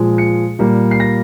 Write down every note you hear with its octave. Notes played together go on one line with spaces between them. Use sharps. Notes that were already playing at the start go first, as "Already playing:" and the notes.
Already playing: A#2 F3 G#3
C#7
A#2 G3 A#3
C7
A#6